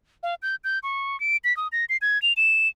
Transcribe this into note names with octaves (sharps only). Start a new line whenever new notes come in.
F5
G6
G6
C#6
D7
B6
D#6
A#6
C7
G#6
F7
E7